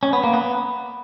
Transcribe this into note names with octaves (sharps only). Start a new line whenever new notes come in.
C#4
B3
A#3
B3